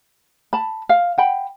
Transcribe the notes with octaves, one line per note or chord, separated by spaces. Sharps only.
A5 B5
F5
F#5 G5 B5